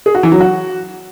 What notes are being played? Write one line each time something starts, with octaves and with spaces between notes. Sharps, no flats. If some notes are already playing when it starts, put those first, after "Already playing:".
G#4
F#4
E3
F#3
F#4